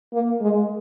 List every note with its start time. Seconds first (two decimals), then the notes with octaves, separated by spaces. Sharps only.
0.13 A#3
0.41 G#3